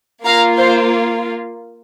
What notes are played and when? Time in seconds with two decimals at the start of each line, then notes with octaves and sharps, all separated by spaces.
0.24 A#3 F4 F5 A#5
0.58 C5